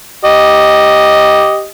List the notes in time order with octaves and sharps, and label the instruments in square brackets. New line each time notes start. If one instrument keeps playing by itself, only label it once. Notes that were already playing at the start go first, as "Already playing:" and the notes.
[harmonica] G4 D#5